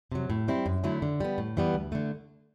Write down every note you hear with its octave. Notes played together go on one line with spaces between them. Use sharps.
C3 F#3
A2
G3 C4 E4 G4
F#2
D3 F#3 A3 E4
D3
G3 B3
A2
E3 G3 B3
D2
D3 A3